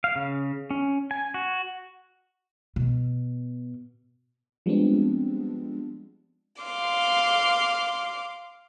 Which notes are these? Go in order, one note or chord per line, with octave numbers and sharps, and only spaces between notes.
F5
C#3
C#4
G#5
F#4
B2
F3 G3 G#3 B3 C4 D4
F5 C6 D6